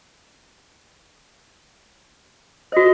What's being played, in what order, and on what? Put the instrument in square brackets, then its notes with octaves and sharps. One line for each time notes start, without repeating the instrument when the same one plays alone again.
[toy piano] F#4 C5 [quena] D#5